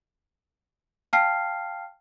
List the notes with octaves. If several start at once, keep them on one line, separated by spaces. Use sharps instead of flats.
F5 G5 A5 F6 C7